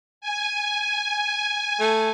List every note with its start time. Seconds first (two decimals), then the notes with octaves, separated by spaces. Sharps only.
0.21 G#5
1.80 A3